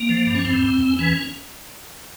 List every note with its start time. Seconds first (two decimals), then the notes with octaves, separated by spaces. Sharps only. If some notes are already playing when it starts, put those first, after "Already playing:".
Already playing: A#3
0.09 F3
0.26 G2
0.35 C#4
0.45 E2 C4
0.63 E2
0.81 E2
0.99 E3 C#4